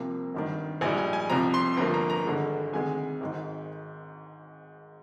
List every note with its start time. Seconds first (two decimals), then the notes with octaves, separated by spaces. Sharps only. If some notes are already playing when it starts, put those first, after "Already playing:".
Already playing: C2 C3 F3 A#3
0.35 G#1 G2 D#3
0.81 A#1 G#2 G3 G#5
0.98 G#5
1.13 G#5
1.30 C2 C3 F3 A#5
1.54 C6
1.77 G1 G2 F3 A#3 A#5
1.94 A#5
2.10 A#5
2.25 G#1 G2 D3 G#3
2.73 D2 C3 D#3 G#3 G#5
3.21 G#1 G#2 D#3